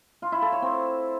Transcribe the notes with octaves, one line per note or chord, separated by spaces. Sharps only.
F4
E4
A4
C#5
C4